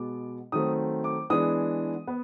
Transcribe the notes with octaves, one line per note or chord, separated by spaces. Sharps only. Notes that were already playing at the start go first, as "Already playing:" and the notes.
Already playing: B2 G#3 B3 D6
D#3 F#3 A3 C4 D#6
D6
E3 G#3 B3 D4 D#6
B3